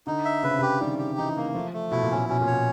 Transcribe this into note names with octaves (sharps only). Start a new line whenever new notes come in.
D3 D#4
E5
C#3 B4
C3
C#3 G4
D#3 G3
G4
E3 D#4
A#3
F3 A3
A3
B2 E4
A#2
B2 C#4
B2 C#4
A#2
B2 C#5